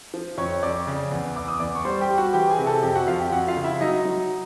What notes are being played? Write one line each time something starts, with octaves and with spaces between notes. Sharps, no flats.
F3
F2 C#5 C#6
F2 D5 D6
C#3
E2
E2 D6
D#6
E2 D5 D6
C#6
G3 C5 C6
G4 G5
G3
F#4 F#5
E3 G4 G5
G#4 G#5
C3
A4 A5
F2 G4 G5
F#4 F#5
F2 F4 F5
G4 G5
F2 F#4 F#5
F4 F5
C#3
E4 E5
F#3 D#4 D#5
F#3